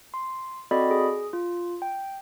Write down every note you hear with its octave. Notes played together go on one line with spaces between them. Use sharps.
C6
C4 F#4 A4 D5 D#5 B5
G#4
F4
G5